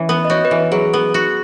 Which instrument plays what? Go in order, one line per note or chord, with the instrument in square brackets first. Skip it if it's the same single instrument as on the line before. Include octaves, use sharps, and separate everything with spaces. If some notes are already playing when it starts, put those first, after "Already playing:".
Already playing: [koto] E3 C#4
B3
[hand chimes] D#5
[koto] F#4 [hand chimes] C#5
[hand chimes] B4
[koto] E3
[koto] F#3 [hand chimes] G#4
[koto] B3
F#4